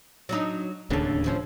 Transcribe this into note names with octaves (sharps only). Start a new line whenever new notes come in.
F#3 D4 D#4
D1 D#2 C#3 D4 A4
F2 F3 C#4